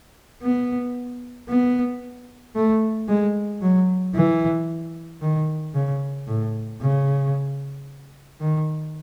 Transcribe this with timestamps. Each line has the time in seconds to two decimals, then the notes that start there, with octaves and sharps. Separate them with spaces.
0.42 B3
1.49 B3
2.55 A3
3.08 G#3
3.62 F#3
4.15 E3
5.21 D#3
5.74 C#3
6.27 A2
6.81 C#3
8.41 D#3